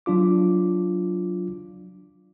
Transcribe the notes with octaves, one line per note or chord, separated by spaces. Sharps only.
F#3 D4 F4 D6